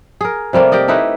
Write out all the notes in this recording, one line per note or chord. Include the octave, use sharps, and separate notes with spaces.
G#4 A#4
C3 G3 A3 A#3
G4 A#4 D5 D#5
A3 D#4 E4 B4